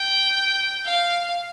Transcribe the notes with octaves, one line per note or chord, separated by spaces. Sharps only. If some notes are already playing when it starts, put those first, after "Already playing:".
Already playing: G5
F5